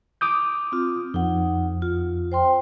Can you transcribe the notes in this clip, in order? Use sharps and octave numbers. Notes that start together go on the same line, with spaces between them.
D6 D#6 G6
C4 F4
F2 D#4 F#5
F4
C5 G5 C6